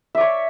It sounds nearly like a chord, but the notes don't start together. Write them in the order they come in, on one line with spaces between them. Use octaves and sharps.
E5 D5 C#5